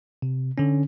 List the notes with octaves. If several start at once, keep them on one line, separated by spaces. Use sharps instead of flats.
C3
D3 C#4